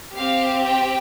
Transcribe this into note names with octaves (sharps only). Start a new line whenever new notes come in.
C4 G4 F5
G5